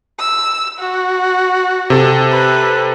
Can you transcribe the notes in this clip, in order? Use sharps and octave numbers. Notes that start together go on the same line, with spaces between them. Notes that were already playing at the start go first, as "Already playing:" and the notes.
E6
F#4
C3 A4
B4